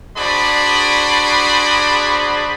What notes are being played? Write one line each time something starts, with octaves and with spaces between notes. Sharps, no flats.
D4 F#4 G#4 C5 D5 B5